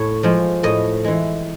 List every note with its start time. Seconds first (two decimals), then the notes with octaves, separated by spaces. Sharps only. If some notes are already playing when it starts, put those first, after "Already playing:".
Already playing: A2 C#5
0.23 F3 G#3
0.63 A2 D#5
1.04 E3 G#3